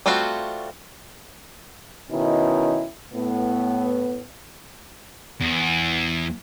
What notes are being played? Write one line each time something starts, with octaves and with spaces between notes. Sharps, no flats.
G3 A3 C4 F4 F#4
B2 D#3 C#4 E4
A2 B3
E2